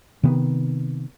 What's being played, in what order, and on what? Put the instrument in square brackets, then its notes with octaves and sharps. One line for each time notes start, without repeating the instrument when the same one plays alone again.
[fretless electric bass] C3 D#3 B3